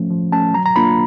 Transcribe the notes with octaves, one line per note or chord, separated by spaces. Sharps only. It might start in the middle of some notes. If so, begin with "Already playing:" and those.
Already playing: F3 A3 C#4
F3
A3 C#4 A5
F#3 A#5
A#5
A#3 D4 F4 B5